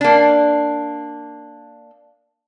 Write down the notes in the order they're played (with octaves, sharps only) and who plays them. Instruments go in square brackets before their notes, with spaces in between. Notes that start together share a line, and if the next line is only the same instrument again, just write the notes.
[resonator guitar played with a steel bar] A#3 D4